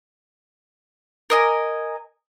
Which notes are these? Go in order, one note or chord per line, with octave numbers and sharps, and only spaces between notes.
A#4 D#5 G#5